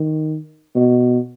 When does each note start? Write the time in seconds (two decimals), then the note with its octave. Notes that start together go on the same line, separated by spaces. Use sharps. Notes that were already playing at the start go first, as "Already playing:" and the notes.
Already playing: D#3
0.76 B2